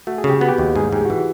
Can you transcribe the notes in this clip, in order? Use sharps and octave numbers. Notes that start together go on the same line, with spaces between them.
A3 F#4
G#4
C#3
G4
B3 F#4
G4
D#2
G#2 G#4
G#2 G4
E3 F#4